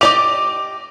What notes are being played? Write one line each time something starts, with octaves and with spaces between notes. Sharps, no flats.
G4 D5 D#5 D6 F7